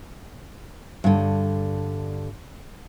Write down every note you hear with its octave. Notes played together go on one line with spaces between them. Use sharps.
G2 D3